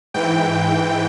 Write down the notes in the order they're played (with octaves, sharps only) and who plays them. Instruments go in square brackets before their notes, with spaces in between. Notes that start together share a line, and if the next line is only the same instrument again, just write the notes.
[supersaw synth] G#2 E3 G5